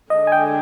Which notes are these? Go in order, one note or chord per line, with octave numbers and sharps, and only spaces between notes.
D3 G#3 D4 D#5
G#5
G5